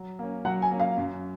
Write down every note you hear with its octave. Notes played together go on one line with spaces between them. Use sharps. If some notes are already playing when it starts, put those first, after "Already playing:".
Already playing: F#3
A#3 C#4
F#3 F#5
G#5
A#3 C#4
F5
F#2